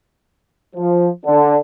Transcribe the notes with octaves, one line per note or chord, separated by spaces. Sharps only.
F3
D3